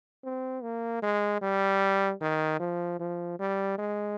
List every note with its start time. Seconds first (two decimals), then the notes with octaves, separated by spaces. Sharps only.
0.24 C4
0.63 A#3
1.02 G#3
1.41 G3
2.21 D#3
2.60 F3
2.99 F3
3.39 G3
3.78 G#3